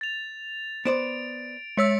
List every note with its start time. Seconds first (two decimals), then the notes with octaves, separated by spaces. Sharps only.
0.01 A6 F7
0.85 B3 C5 D5 D7
1.77 G#3 C#5 E6 B6 C#7